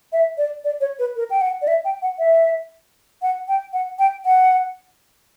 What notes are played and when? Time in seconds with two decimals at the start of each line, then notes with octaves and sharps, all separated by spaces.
0.13 E5
0.38 D5
0.65 D5
0.81 C#5
0.99 B4
1.16 A#4
1.30 G5
1.41 F#5
1.62 D5
1.68 E5
1.85 G5
2.02 F#5
2.19 E5
3.22 F#5
3.48 G5
3.73 F#5
3.99 G5
4.25 F#5